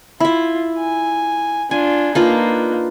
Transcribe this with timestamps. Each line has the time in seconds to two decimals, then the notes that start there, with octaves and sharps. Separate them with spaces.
0.20 E4 F4 E5
0.78 G#5
1.71 D4 F4 G#5
2.15 A#3 D4 D#4 F4 B4